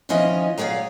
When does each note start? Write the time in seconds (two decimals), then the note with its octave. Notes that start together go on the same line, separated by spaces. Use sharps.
0.09 D#2 E3 F3 C#4 D#5 G#5
0.58 F#3 G#4 C#5 D5 F5